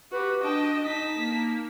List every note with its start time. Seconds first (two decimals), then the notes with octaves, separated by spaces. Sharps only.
0.12 F#4 G4 B4
0.43 D4 D#5 G5 A5
0.85 D#4 A5 B6
1.18 A#3